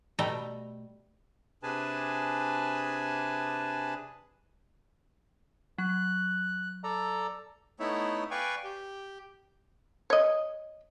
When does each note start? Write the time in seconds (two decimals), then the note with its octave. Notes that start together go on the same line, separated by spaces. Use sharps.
0.19 B2 G3 A3 G5 A#5
1.63 C3 D4 G#4 B4 G#5 A5
5.78 F#3 F#6
6.84 A4 D5 A#5
7.80 A3 B3 D#4 E4 C#5 E5
8.31 B4 D5 F5 G5 G#5 C#6
8.64 G4
10.10 C#5 D#5